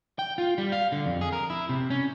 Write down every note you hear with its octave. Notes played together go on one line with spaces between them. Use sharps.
G5
F4
G3
F5
D3
F2
G#4
A#4
E4
C3
C#4